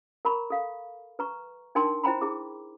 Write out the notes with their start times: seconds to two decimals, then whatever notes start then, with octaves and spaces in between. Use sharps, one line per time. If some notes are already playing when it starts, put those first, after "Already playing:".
0.25 A#4 A#5 B5 C#6
0.50 A4 F5
1.19 B4 A#5 C#6
1.75 D4 D#4 A#4 G5 A5 C6
2.04 E4 C5 G5 A#5 B5
2.21 E4 G#4 D6